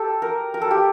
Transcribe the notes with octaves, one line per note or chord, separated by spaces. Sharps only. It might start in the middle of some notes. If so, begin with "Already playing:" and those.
Already playing: G4 A4
A#4
A#4
A4
G4